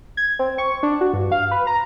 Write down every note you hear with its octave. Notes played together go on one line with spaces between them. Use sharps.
G#6
C4
C#6
D4
F#4
G2
F5
B4
A#5